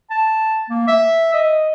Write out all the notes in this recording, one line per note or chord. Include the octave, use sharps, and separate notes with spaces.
A5
A#3
E5
D#5